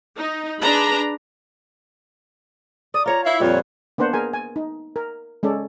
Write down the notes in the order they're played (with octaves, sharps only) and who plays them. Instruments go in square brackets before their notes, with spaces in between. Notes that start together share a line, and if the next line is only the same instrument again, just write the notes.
[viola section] D#4
D4 G#4 B4 A#5 B5
[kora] D5 [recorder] D#6
[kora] F4 C#5 [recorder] A#5
[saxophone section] E4 [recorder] F5
[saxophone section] F2 [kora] A#2 G3 B4 [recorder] C#5
[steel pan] A#3 B3 D4 C5 F#5
G#4 A#4 G#5
G#5
D#4
A#4
G#3 C#4 A4 D5